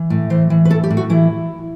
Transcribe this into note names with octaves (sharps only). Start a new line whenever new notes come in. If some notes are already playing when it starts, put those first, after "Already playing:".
Already playing: E3
A2
E3 C5
E3
B4
A2 A4
G4
A2
F#4
E3 E4